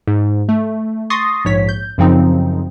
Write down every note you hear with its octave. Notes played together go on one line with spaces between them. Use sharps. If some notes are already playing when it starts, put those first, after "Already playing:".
G#2
A3
C6 C#6 D#6 A6 A#6 C7
A#1 G#2 C#5 B6
G6
F#2 C#3 F3 C4 D#4